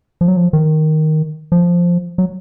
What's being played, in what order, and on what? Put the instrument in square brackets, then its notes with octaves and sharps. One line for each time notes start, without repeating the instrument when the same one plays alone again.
[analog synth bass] F3
F#3
F3
D#3
F3
F#3